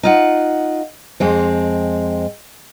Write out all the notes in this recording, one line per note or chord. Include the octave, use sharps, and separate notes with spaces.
D#4 F4 F#5
F2 G#3 C4